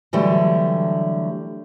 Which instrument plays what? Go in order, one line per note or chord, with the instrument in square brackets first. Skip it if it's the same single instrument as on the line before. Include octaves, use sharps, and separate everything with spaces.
[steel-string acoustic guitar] D3 E3 F#3 G3 A3